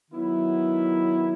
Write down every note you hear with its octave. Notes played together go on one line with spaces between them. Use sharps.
D#3 F#3 B3 E4